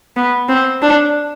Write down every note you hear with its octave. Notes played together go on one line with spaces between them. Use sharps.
B3
C4
D4